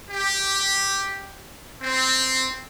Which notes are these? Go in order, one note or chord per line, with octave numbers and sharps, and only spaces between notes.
G4
C4